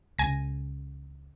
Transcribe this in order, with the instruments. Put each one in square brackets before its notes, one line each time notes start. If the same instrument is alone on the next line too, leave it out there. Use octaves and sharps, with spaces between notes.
[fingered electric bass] C#2 C#3 [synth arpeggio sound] G#5 A#6